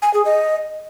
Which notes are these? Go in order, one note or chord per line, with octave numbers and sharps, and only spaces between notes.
G#5
G#4
D#5